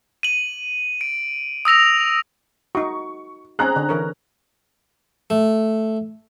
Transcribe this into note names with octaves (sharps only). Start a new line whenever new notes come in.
D#7 F#7
D7
D#6 E6 A#6 F7
D#4 F#4 C#6
C4 C#4 G#4 A#5 F#6
D3
E3 A#4 C#5
A3